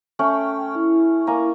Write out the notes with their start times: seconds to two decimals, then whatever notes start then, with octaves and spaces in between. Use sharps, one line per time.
0.19 A3 C#4 G5
0.75 E4
1.27 A#3 G#5 A#5